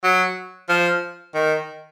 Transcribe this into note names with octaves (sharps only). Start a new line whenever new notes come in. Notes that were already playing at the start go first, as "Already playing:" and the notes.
F#3
F3
D#3